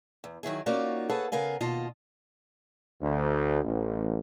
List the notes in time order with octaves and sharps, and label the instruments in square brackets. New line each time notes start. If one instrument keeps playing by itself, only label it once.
[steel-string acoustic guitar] E2
D#3 F#3 E4 G#4
A#3 C#4 D#4 F4 F#4 D5
G#4 A4 B4 C#5 F#5 A5
C#3 B3 A#4 F5 G#5
D#2 B2 F4 D#5 A5
[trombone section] D2
A1